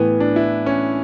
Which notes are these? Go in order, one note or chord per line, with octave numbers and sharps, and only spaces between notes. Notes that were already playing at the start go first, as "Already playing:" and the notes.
Already playing: A2 E3 B3
D4
E4
C#4